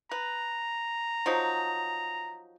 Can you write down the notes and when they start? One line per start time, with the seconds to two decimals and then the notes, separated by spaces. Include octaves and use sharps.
0.11 B4 A#5
1.26 F3 F#3 D#4